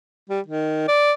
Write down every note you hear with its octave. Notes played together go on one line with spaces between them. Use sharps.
G3
D#3
D5